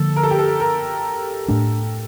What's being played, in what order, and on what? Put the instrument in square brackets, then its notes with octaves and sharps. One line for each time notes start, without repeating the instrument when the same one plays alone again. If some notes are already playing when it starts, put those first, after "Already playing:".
Already playing: [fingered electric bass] D3 F3 A#3 [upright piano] A4
[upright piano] A#4
A4
G4
A4
A#4
[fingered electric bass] A2 A3 D4